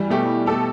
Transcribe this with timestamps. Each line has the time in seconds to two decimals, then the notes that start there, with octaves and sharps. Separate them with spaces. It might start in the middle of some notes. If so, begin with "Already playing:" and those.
Already playing: E3 G3
0.10 B2 A3 G4
0.46 B2 A3 G4 A4